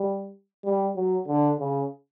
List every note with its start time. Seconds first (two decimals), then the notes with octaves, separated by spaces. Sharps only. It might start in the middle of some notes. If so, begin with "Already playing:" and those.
Already playing: G3
0.65 G3
0.96 F#3
1.27 D3
1.59 C#3